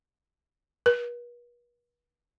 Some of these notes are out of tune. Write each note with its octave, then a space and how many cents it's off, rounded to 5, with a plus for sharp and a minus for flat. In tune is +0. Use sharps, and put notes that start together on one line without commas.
B4 -45